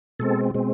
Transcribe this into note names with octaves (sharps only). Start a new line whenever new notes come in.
B2 G#3 C4 A4
B2 G#3 C4